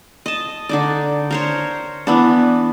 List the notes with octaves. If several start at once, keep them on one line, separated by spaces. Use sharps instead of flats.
D#5 A5
D3 D#4 D5
A#4 C5 C#5
E3 B3 D4